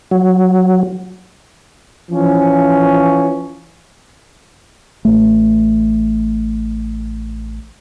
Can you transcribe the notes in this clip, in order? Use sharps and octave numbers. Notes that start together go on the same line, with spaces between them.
F#3
E3 F3 C#4
A1 A3